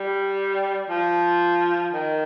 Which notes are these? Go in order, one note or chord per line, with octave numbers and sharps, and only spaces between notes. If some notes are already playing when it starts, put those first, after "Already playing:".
Already playing: G3
F3
D#3